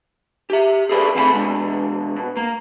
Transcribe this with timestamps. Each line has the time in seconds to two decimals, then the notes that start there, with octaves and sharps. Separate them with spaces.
0.50 G4 E5
0.89 G#4 A4 B4 C#5 D5
1.15 D#2 A2 C4 F5 G#5 B5
1.31 B2 G#3 D4
2.16 B2
2.37 A#3